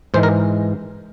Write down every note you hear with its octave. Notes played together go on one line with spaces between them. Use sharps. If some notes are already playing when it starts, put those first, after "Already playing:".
G#2 E3 G#3 C5
A#4